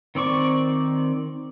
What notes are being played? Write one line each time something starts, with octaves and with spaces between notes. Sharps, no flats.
D#3 C4 D5 C#6